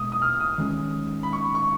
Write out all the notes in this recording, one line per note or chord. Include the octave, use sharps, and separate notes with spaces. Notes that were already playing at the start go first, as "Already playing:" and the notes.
Already playing: B2 G#3 D#6
D#6
F6
D#6
D#3 G#3 C#4
B5
C#6
C#6